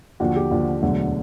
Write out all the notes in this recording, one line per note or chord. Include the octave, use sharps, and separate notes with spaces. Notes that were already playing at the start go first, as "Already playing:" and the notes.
D#2 D3 F3 F#4
G4
D#2 D3 F3
E1 D2 D3 F#3